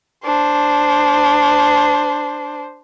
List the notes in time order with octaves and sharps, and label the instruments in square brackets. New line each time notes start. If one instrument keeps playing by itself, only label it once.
[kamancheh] D4 C5